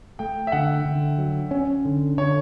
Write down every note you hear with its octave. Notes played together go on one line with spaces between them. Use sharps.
A3 G5
E5
D3 F#5
D3
F#3
C#4
D3
D3 C#5